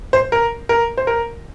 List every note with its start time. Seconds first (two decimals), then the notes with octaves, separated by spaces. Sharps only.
0.13 C5
0.32 A#4
0.69 A#4
0.97 C5
1.07 A#4